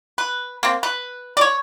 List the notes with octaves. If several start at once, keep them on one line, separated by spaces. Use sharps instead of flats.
B4
A#3 C4
B4
C#5 D5